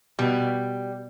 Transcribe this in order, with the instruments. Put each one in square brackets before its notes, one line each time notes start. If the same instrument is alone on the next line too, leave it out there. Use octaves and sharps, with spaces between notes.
[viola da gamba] B2 [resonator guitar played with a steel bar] G3